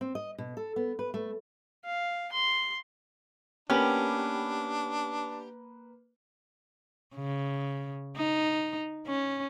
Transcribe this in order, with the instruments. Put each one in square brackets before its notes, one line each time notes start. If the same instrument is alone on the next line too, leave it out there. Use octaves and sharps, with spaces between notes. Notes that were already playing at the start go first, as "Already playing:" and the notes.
[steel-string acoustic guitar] C4
D#5
B2
A4
B3
B4
A3
[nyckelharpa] F5
C6
[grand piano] A#3 B4 F#7 [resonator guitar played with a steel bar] B3 G4 [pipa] C#4 [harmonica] D4
[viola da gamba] C#3
D#4
C#4